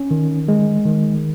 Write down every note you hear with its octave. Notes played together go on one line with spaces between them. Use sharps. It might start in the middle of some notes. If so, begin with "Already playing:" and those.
Already playing: C#4
D#3
G#3
D#3